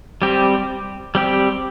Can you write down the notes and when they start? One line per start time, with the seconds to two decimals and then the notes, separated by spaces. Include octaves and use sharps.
0.22 G3 C4 G4
1.15 G3 C4 G4